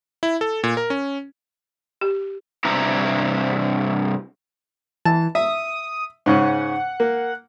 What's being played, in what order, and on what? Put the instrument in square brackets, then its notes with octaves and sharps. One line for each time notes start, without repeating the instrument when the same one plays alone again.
[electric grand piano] E4
A4
A#2
A#4
C#4
[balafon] G4
[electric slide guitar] G2 C3 E4 G4 A#5
[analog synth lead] E3 [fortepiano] A5
[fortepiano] E5 [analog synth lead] D#6
[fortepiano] G#2 C#3 C#4 [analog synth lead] F#5
[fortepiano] A#3